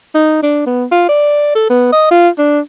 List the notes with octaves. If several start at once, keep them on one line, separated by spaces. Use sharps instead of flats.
D#4
D4
B3
F4
D5
A4
B3
D#5
F4
D4